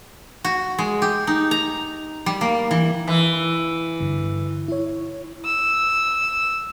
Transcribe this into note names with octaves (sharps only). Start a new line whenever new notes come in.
F#4
G#3
G4
D#4
A#5
G3
A#3
E3
E3
G2 D3
E4 C#5
E6